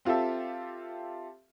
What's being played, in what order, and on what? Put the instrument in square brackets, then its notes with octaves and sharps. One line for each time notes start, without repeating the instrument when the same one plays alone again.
[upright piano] C4 F4 G4 A4 E5